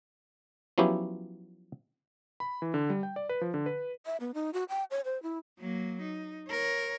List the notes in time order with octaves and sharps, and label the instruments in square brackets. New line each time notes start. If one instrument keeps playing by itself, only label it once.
[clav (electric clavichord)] F3 F#3 B3 C#4 E4 G4
[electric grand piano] B5
E3
D3
G3
G5
D5
B4
F3
D3
B4
[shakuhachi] E5
B3
D#4
F#4
G5
C#5
C5
E4
[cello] F#3 A#3
D#4
A#4 C#5